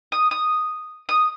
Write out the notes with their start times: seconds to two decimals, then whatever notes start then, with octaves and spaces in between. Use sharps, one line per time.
0.12 D#6
0.31 D#6
1.09 D#6